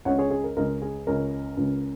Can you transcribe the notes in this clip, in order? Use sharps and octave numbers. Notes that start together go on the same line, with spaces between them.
C#2 C#3 G#3 C#4 C#5 F#5
G#4 C#5
G#4
A#4
C#2 C#3 G#3 C#4 A#4 D#5
G#4
C#2 C#3 G#3 C#4 A#4
C#2 C#3 G#3 C#4